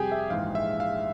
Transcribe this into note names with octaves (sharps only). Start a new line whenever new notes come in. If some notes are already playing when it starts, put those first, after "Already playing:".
Already playing: F2 C3 G3 G4 G#4 G5 G#5
E5
A#1 G#2 E3 G#3 F5
E5
F5